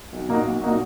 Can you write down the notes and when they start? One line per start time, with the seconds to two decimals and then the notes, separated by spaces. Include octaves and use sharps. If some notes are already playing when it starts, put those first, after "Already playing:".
0.12 B1
0.28 A#2 A#3 D#4 F#4
0.45 B1
0.62 A#2 A#3 D#4 F#4